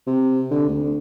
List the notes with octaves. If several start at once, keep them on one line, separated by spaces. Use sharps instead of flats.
C3
D3
D2